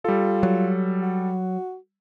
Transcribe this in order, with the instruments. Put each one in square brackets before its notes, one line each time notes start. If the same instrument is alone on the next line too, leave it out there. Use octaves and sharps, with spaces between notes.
[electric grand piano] G3 A4 [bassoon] F4
[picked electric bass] F#3
[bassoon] F#4